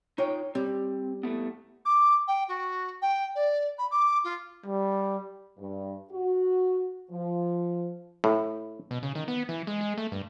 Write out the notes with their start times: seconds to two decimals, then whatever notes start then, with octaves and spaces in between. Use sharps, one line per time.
0.18 D#4 F4 C#5 G5
0.55 G3 C4
1.23 A2 A3 B3
1.85 D6
2.27 G5
2.48 F#4
3.02 G5
3.35 D5
3.78 B5
3.91 D6
4.24 F4
4.66 G3
5.58 G2
6.10 F#4
7.11 F3
8.24 A2
8.91 B2
9.03 C#3
9.15 D#3
9.28 B3
9.49 E3
9.67 G#3
9.81 G#3
9.98 A3
10.12 G2